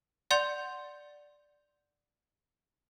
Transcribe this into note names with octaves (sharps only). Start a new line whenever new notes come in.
D5 F#5 C6 G6 F7